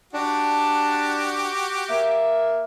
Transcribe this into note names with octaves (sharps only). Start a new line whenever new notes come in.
D4 F#4 G4
A#3 E5